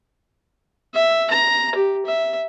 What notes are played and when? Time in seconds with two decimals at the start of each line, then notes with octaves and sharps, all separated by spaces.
0.95 E5
1.31 A#5
1.75 G4
2.06 E5